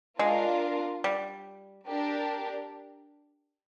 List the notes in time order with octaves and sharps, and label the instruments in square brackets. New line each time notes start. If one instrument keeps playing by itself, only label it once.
[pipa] G#3 [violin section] D4 F4 A#4
[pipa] G3
[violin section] D4 G4 A#4